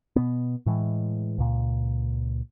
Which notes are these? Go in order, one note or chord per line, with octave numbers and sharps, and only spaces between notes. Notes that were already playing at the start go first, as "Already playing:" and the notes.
B2 B3
A2 E3 G#3
C#2 A#2